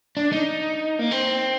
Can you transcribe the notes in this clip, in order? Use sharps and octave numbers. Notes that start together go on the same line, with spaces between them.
D4
D#4
A#3
C4